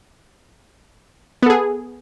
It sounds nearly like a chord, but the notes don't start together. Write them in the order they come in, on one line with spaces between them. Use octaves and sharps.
B3 A4 G#4